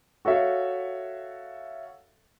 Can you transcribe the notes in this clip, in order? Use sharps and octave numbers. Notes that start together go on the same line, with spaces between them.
F#4 A4 C#5 E5 F5